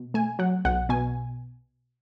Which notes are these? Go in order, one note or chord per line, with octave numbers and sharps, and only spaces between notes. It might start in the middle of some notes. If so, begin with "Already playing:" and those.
Already playing: B2
A3 G#5
F#3 F#5
B1 F#5
B2 G#5